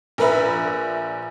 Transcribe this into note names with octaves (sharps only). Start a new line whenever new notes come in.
A#1 A#4 B4 E5